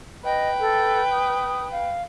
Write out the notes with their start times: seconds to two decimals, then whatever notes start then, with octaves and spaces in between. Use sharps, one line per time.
0.25 B4 D#5 G5
0.60 A4
1.12 D#6
1.72 F5